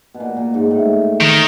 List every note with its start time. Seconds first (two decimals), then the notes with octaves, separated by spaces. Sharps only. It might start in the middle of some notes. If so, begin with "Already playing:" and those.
0.14 B2
0.20 A#2
0.37 A#2
0.54 G#2
0.71 A2
1.21 D#3